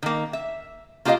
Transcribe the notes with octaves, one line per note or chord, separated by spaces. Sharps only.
D#3 A#3
E5
A#3 F4 G4 B4 D#5 F5